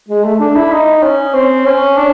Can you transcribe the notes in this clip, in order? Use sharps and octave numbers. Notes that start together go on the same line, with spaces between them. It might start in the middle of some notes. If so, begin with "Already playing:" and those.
G#3
A3
D4
E4
D#4
C#4
C4
C#4
D4